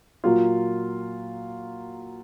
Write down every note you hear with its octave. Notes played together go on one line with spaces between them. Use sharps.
A#2 F#3 A#3 F4